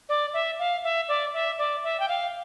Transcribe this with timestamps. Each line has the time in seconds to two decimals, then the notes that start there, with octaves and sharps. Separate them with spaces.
0.09 D5
0.34 E5
0.59 F5
0.84 E5
1.08 D5
1.34 E5
1.58 D5
1.84 E5
2.00 G5
2.08 F5